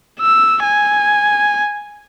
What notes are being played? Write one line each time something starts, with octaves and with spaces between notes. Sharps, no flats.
E6
G#5